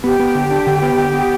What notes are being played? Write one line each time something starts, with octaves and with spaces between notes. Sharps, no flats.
B3 G4
B3
D3
D4
D3
B3
D3
B3